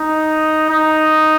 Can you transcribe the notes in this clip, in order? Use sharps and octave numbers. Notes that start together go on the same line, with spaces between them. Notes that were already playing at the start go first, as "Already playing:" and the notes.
Already playing: D#4
D#4